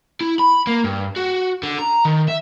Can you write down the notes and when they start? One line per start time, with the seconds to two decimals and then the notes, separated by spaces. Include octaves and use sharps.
0.21 E4
0.39 B5
0.67 A#3
0.84 G2
1.17 F#4
1.63 D3
1.79 A#5
2.05 D#3
2.28 E5